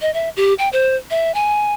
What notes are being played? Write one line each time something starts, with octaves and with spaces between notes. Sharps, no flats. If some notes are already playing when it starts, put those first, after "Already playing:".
D#5
E5
G4
G5
C5
E5
G#5